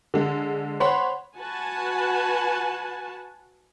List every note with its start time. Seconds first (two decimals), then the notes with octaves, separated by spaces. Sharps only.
0.14 D3 G#3
0.80 C5 C#5 F#5 B5 C6
1.37 F#4 B4 F#5 G#5 A5